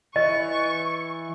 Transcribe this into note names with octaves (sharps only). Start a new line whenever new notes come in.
E3 D#5 C#6